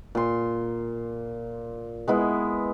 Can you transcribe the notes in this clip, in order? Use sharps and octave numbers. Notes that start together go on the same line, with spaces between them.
A#2 C6
G#3 B3 E4